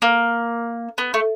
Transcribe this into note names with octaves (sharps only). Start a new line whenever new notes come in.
A#3
B3
A3